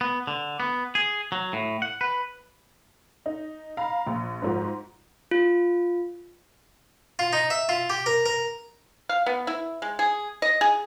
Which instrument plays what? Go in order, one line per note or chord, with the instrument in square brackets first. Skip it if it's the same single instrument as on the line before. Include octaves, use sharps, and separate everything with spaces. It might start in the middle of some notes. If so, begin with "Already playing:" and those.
[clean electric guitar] B3
D3
B3
G#4
F#3
A2
F#5
B4
[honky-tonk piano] D#4
F5 A#5 B5
A#1
G#2 F3 F#4
[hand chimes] F4
[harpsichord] F4
D#4
E5
F4
G4
A#4
A#4
[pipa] F5
B3
E4
G#3
G#4
D#5
G#4